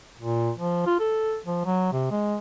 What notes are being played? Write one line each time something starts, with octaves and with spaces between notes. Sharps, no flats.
A#2
F3
F4
A4
F3
F#3
C3
G#3